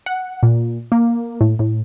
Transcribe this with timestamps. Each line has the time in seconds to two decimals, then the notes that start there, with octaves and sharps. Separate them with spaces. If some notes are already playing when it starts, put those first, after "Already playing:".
0.06 F#5
0.43 A#2
0.92 A#3
1.41 A2
1.59 A2